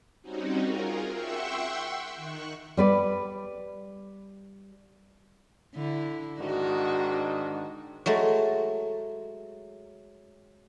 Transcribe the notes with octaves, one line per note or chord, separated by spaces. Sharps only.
G3 C4 C#4 D#4 F#4
F4 G#4 A#4
E5 F#5 G5 C6 C#6 E6
D#3 C#6 F#6
G3 B4 D5
D3 E4
G#2 D#3 D4 F#4
F#3 G#3 A3